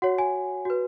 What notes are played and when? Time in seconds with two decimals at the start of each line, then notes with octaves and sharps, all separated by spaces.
0.02 F#4 C#5 F#5
0.18 G#5
0.65 F#4 B4